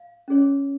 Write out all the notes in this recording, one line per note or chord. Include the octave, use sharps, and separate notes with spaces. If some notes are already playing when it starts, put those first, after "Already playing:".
Already playing: F5
C#4 G#4 C#5